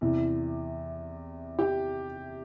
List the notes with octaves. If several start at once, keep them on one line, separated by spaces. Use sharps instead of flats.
E2 C3 E3
G4